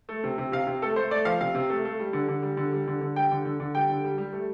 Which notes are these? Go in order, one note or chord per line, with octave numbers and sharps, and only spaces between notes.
A3
C3
C3
C3 F5
C3
A3 A4
A3 C5
A3 D5
F3 F5
C3 F5
C3
A3
A3
G3
D3
D3
G3
D3
G3
D3
D3
G3 G5
D3
D3
D3
G3 G5
D3
G3
G3
A3